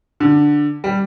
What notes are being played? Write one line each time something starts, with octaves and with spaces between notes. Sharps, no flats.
D3
G3